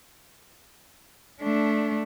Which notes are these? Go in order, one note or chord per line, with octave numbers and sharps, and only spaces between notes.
A3 D4